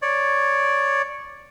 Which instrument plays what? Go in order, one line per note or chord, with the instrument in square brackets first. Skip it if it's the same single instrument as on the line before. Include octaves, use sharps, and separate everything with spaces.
[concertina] C#5 D5